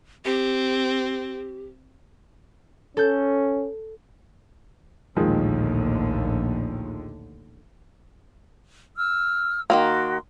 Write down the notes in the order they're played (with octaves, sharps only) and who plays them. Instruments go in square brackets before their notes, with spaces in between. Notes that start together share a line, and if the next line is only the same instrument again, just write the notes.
[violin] C4 [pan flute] G4
[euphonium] C#4 [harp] A4 G6
[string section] A#1 D3 [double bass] D#2 A2 [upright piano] D#3 F3 G#3
[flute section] E6 F6
[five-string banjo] D#3 G3 A#3 [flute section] F#4 C6